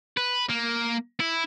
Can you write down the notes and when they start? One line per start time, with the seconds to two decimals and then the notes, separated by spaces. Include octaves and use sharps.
0.17 B4
0.49 A#3
1.20 E4